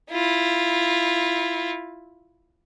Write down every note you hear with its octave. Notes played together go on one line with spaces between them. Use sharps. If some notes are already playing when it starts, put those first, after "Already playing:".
E4 F4